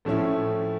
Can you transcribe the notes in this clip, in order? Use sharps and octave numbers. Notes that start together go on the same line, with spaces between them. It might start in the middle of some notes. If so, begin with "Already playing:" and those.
A2 F3 A3 C#4 E4